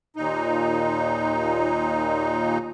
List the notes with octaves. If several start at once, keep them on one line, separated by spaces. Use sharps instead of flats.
D#2 A#2 D#4